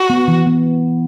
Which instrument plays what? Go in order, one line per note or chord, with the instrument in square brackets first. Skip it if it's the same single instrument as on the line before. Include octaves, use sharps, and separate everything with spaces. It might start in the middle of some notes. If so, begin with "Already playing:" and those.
Already playing: [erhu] F#4
[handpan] B3
E3
B3